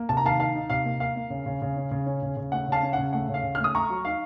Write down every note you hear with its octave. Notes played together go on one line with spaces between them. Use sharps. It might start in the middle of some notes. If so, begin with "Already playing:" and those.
Already playing: A#3
C3 A5
A#5
D#3 F5 A5
D#4 F5 A5
D#4
C3 F5
A#3
A#3 F5
A#3
C#3
C#3
C#3
C#4
C#3
C#4
C#3
C#3
A3 F#5
C#3 F5 A5
C#4
F#5
C#3
A3 F#5
C#3
F5
C#3
A3 F6
D#6
A3 A#5 C#6
F#3
D#4 F5